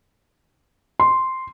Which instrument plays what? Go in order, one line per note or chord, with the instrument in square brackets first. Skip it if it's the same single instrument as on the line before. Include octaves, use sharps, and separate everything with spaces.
[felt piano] C6